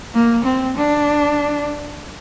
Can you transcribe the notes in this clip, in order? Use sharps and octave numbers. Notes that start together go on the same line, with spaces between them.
A#3
C4
D4